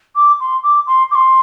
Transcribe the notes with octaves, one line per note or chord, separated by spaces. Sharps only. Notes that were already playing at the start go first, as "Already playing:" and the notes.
D6
C6
D6
C6
D6
C6